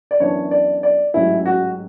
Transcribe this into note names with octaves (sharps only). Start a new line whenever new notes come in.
D5
F#2 E3 B3 D4 C#5
D5
D5
A1 G#2 F#3 C#4 E4
F#4